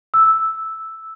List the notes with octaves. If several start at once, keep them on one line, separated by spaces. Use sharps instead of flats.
E6